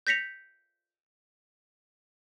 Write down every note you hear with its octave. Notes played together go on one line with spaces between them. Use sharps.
G6 A#6 B6 C#7 F7